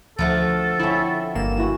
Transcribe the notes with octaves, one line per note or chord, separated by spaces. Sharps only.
D2 F3 A3 F#4 A4
D3 C4 C#4 E4 E5
G1 A#3 E7
E3 E4 F#4